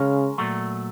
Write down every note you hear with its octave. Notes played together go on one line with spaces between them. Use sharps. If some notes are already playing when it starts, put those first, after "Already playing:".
Already playing: C#3 G#3 C#4 A#4
A#2 F#3 A3